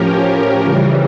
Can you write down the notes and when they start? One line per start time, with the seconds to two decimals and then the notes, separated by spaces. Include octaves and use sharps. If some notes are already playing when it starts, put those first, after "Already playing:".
Already playing: A2 F3 C#4 G4 A#4
0.64 C#3 E3 G3